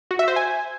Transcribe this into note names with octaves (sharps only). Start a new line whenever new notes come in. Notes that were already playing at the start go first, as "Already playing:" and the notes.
F#4
E5
C5
G#5